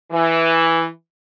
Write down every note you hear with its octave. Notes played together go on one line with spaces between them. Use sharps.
E3